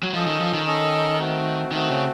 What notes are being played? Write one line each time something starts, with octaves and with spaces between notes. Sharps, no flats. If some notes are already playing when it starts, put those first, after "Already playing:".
F#3
F3 C#4 A4 D#5
D#3
F3
D#3
C#4 A4 D#5
A3 C4 F#4
D#3 A3 C4 F#4
C#3